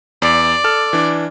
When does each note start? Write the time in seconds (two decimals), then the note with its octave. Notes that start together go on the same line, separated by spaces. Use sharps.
0.22 E2 D5
0.64 A4 F6
0.93 E3 D4